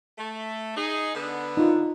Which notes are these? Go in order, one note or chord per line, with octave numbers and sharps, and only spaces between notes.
A3
D#4 G#4
D3 B3
D#4 F4